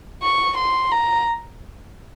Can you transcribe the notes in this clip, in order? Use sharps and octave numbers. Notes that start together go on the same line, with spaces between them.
C#6
C6
A#5